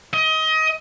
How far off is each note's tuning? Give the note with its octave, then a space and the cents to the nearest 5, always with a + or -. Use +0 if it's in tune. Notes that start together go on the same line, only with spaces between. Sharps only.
D#5 +25